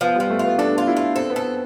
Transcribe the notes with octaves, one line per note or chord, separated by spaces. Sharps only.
F3 B3
F3 G3
A3
F4
B3
D4 A4
F4
E4
F4
C4 A4
B3
A4